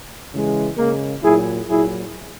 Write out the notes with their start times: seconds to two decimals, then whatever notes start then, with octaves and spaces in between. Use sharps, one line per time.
0.32 C#3 E3 G#3
0.76 C#3 G#3 A#3
1.22 A#2 F#3 E4 G#4
1.68 A#2 F#3 E4 G#4